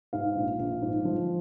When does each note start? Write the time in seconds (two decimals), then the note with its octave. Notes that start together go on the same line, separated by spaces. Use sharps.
0.13 G#2 F5
0.36 A#1
0.59 A#1
0.82 G#2
1.05 F3